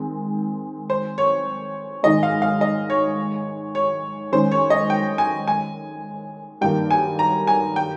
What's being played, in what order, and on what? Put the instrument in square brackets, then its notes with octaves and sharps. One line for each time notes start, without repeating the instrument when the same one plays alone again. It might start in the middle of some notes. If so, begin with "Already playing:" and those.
Already playing: [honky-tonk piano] D#3 G#3 C4
[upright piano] C5
C#5
[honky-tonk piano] G#2 D#3 G#3 D#4 [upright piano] D#5
[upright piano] F5
F5
D#5
C#5
C#5
[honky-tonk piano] D#3 G#3 C#4 [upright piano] C5
[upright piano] C#5
D#5
G5
G#5
G#5
[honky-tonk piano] G2 D#3 A#3 D#4 [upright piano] G5
[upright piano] G#5
A#5
G#5
G5